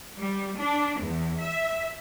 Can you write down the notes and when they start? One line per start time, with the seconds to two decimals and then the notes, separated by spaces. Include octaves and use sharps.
0.19 G3
0.56 D4
0.99 E2
1.39 E5